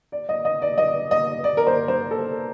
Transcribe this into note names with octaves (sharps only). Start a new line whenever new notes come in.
D5
D#5
D#5
D5
D#5
D#5
D5
A#4
C5
C5
A4